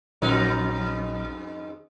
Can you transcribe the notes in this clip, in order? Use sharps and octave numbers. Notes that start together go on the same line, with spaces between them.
A#1 F2 G#2 F#3 D#4